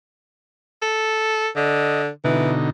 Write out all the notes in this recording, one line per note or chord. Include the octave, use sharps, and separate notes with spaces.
A4
D3 D#5
B2 D3 E3 D#4